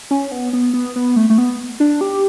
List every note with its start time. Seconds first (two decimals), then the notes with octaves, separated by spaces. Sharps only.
0.11 C#4
0.32 B3
0.53 B3
0.73 B3
0.96 B3
1.16 A3
1.30 A3
1.38 B3
1.80 D4
2.01 G4